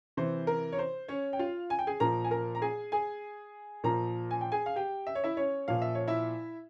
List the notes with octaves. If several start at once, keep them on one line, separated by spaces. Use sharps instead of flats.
C3 E3 C5
A#4
C#5
C5
C#4 C#5
G5
F4 F5
G#5
G5
G#4 G#5
A#2 F3 A#4 A#5
G#5
A#4 A#5
A#5
G#4 G#5
G#4 G#5
A#2 F3 A#4 A#5
G#5
G5
G#4 G#5
F5
G4 G5
E5
C#5
E4 E5
C#4 C#5
A#2 F3 F5
E5
C#5
E4 E5